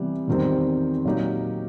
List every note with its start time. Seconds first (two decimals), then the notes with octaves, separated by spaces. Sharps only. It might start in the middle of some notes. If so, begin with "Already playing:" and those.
Already playing: C3 E3 G3 B3
0.27 E2 C3 D#3 G3 C4
1.05 A#2 F#3 A#3 D#4 G4